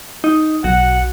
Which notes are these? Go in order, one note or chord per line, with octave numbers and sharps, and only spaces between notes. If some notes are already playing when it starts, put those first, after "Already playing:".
D#4
B1 F#4 F#5